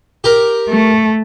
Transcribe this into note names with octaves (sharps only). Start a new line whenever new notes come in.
G4 A#4
A3